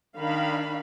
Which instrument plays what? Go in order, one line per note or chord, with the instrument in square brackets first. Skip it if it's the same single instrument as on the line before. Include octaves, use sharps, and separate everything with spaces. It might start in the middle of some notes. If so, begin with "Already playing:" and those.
[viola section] D#3 D4 F5 B5